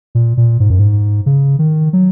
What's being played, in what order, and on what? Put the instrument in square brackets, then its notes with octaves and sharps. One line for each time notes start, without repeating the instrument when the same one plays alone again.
[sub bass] A#2
A#2
G#2
F#2
G#2
C#3
D#3
F#3